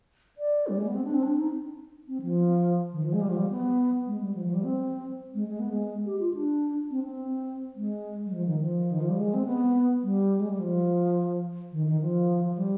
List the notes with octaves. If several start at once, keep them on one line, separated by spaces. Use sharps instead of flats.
D5
G3
G#3
B3
C4
D4
C4
D4
D#4
C4
F3
D#3
F3
G#3
G3
F3
G3
B3
G#3
G3
F3
F3
G3
C4
G#3
G#3
B3
G#3
G4
F4
D4
C4
C4
G#3
G3
F3
D#3
F3
D#3
F3
G3
G#3
C4
B3
G3
G#3
G3
F3
D#3
D#3
F3
F3
G3